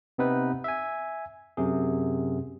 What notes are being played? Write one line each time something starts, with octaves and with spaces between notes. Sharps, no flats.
C3 B3 C4 D#4 B4
E5 G#5
F#2 C3 G#4